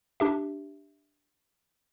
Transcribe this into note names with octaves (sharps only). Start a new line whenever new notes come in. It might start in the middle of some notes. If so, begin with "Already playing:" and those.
D4 G4 E5